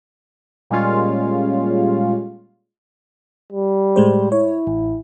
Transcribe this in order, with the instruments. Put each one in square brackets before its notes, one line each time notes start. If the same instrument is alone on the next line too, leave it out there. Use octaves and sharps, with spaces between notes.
[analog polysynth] A#2 G3 G#3 C#4 F4
[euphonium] G3
[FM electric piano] A2 G#3 C5
[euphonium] E4 [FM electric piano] C#5
[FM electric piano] A1